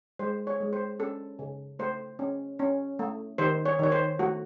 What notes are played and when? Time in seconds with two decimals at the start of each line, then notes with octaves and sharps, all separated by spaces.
0.19 G#3 C5
0.47 C#5
0.60 G#3
0.73 C5
0.99 C#4 A4
1.39 C#3
1.79 A3 C5
2.19 C#4
2.59 C#4
2.99 A3
3.38 D#3 C5
3.66 C#5
3.79 D#3 C#5
3.92 C5
4.19 A3 F#4